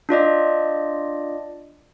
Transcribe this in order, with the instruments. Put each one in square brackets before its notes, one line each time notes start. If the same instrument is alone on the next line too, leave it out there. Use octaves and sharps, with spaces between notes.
[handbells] D4 F4 D5 D#5